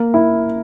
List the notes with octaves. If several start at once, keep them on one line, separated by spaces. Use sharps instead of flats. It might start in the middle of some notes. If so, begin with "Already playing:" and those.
Already playing: A#3
E4